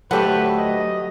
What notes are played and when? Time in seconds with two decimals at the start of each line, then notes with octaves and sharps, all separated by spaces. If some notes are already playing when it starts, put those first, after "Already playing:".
0.11 D2 F#3 A3 G4 A4 B4 C5 F#5
0.58 D#5